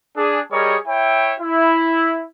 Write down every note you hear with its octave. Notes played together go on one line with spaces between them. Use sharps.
D4 G#4
G3 G#4 A#4 C#5 D#5
E4 C#5 E5 G5
E4